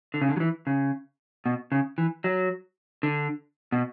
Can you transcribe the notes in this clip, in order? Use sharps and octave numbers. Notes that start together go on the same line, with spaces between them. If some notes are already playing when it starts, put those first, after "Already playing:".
D3
C#3
D3
F#3
E3
C#3
B2
C#3
E3
F#3
D3
B2